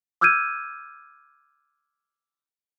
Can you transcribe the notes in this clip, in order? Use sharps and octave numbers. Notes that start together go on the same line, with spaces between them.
D6 E6 F6 G6 G#6 D#7